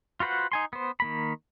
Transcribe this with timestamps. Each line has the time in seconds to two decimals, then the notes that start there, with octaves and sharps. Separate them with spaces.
0.20 F4 F#4 B4 C5 F#5
0.52 D#4 G#5 C6
0.73 B3 C5
1.00 D#3 A#3 B5